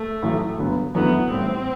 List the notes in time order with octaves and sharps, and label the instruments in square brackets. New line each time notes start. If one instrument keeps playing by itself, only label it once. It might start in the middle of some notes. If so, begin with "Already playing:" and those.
Already playing: [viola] A3
[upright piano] A1 A2 F#3
G1 G2 F#3 B3
[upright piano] F#2 D3 F#3 A3 E4 [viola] B3
[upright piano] A1 A2 G3 [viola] C4